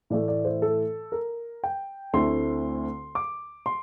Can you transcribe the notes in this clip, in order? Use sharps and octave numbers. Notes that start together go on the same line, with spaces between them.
A2 E3 A3 E4 D5
D5
C5
A4
A#4
G5
D2 D3 A3 C4 E4 C6
D6
C6